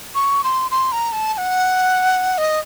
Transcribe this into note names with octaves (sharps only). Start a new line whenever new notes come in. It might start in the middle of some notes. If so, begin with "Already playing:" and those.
C#6
C6
C6
A#5
A5
A5
F#5
D#5